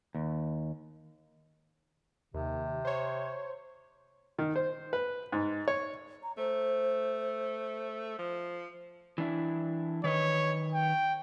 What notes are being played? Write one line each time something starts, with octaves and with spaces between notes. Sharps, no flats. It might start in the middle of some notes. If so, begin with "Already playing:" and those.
D#2
D#2 C3
C5 C#5
D#3
C5
B4
G#2
C#5
A#5
A3 C5
F3
E3 D4 E4
D#3 B4 C#5 D#5
G5